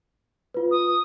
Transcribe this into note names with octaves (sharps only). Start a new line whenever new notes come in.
F4 B4
D#6